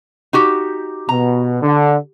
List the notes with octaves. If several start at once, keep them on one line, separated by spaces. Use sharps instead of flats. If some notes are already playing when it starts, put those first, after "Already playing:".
D#4 F#4 G4
B2 A#5
D3